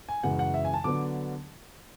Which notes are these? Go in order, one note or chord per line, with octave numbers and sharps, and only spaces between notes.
G#5
F#2 C#3 E3 G#3 F#5
F#5
E5
G#5
A5
D3 F#3 B3 D4 D6